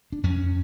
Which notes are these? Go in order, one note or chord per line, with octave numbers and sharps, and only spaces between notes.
D4
F2 C#4